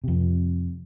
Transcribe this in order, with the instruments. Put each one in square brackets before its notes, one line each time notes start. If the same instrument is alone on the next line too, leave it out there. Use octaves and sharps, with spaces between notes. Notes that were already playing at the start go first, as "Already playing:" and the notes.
[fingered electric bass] F2 C3